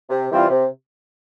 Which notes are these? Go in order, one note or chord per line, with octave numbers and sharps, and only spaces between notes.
C3
E3 G3 C4 F4
C3